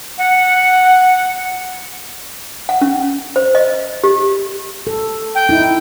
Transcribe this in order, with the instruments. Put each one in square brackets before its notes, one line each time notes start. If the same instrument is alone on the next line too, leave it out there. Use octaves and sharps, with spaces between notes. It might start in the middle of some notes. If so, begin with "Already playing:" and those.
[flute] F#5
[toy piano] F#5
C#4
C5
D#5
G4
[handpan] A4
[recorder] G5
[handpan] D#4 E4